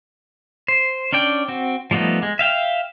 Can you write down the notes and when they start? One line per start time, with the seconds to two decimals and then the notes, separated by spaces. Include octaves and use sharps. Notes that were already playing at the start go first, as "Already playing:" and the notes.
0.68 C5
1.13 C#4 D4 D5 G5
1.48 C4 F#4
1.91 F3 G3 A3 B3 D#4
2.23 G#3
2.39 E5 F5 G5